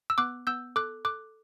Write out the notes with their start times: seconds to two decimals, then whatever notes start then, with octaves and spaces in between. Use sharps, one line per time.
0.10 E6
0.18 B3 D6 F#6
0.47 B3 E6 G6
0.76 A4 D6 F#6
1.05 A4 D6 F#6